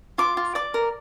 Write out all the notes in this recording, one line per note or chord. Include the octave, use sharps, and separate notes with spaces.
F4 D6
F4
D5 D6
A#4